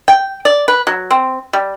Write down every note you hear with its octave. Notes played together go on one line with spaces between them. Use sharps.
G5
D5
B4
F#3
C4
G3